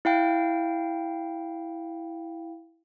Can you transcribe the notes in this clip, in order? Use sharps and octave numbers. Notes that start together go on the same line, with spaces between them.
E4 F5 G5